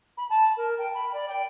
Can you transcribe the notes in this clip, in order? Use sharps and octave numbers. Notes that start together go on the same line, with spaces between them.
B5
A5
A#4
G5
B5
D5
G5